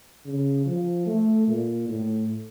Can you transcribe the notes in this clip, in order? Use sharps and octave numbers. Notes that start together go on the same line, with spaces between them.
C#3
F3
A3
A#2
A2